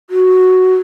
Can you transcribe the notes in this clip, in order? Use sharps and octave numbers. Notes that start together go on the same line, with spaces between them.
F#4